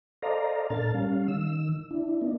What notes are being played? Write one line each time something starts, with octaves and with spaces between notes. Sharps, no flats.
A4 C5 D5 D#5 F5 A#5
A#2 D4 A4 A#4 F6 A6
G3 C#4 F5
D#3 E6
D4 E4
A#3 B3 D4 D#4